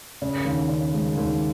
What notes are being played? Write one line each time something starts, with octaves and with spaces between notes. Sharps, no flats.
C#3
D#2
C#3
G#3
D#2